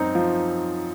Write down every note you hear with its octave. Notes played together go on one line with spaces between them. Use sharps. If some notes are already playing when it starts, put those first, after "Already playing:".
Already playing: F#2 C4 D#4
F3